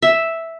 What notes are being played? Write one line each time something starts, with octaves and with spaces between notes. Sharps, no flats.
E5